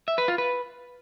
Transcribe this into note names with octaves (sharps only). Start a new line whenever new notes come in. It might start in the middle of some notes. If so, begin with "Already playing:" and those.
E5
B4
F4
B4